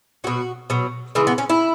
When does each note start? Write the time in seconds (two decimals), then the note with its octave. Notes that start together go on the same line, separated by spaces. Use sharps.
0.24 B2 F#3 F#4
0.70 B2 F#3
1.15 C#3 E3 G#3 E4
1.27 B3
1.38 C#4
1.49 E4